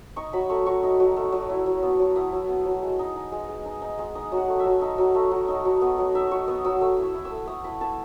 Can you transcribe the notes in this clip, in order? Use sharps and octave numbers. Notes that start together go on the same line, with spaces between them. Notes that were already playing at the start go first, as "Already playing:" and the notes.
D#4 C#6
F#3 B5
A3 C#6
F#3 C#6
D#4
F#3
A3
F#3
E4
F#3
B3
F#3
E4 D#6
F#3
B3
F#3
G#3
D#4
D#4
G#3
G#3
D#4
D#4
G#3
D#4 D#6
F#3
F#5
A3
E5
F#3
D#4
F#3
A3
F#3
D#4
F#3
B3
F#3
D#4 E5
F#3 C#6
B3 D#6
F#3 E6
A3 E6
E4
E6
E4
E6
A3
A3 D#6
E4 B5
E4 A5